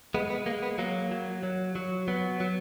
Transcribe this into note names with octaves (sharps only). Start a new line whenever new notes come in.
G#3 B3
B3
G#3 A#3
B3
F#3 A#3
F#3
F#3
F#3
F#3 B3
F#3